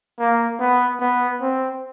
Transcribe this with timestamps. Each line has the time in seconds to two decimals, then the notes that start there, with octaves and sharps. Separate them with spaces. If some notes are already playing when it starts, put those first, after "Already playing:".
0.19 A#3
0.60 B3
1.00 B3
1.41 C4